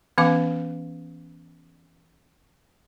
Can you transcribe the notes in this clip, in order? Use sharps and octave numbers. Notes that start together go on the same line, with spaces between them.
E3 B3 C#4 F5 D6